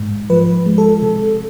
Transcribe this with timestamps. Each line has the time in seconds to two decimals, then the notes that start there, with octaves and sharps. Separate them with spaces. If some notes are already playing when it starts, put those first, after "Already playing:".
Already playing: G#2
0.30 F3 B4
0.66 G#3
0.78 A4
1.02 C3